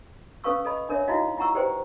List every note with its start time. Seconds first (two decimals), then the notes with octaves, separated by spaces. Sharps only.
0.44 C#4 A4 B4 F5 C#6 E6
0.65 A4 D#5 B5
0.89 D4 A#4 C#5 D5 E5
1.08 D#4 E4 F#4 D#5 F5
1.37 E4 F4 F#5 A#5 C#6 E6
1.55 G4 B4 C5 D5 G5